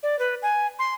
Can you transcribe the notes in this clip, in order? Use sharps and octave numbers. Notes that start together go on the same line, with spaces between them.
D5
B4
G#5
C6